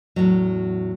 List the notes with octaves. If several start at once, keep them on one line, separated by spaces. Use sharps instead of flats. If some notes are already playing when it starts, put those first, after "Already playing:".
E2 A2 F#3